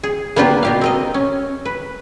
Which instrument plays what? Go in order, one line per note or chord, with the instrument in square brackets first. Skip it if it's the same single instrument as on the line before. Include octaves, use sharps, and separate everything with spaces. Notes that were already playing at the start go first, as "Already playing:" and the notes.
[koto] G#4
A#3 B3 D4 F4 G4
B2 G4 F5
C4 A#4 D#5
C#4
B4